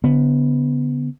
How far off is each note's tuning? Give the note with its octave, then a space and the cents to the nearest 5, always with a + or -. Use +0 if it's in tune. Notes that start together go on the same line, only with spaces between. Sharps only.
D3 -35 B3 +0